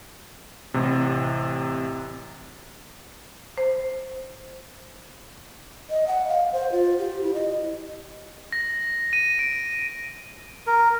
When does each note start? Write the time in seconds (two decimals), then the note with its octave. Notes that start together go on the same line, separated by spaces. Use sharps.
0.74 A1 C3
3.58 C5
5.90 D#5
6.07 F#5
6.28 F5
6.53 C5
6.72 F4
6.99 G4
7.22 E4
7.34 D#5
8.52 A#6
9.13 D#7
9.39 D7
10.67 A#4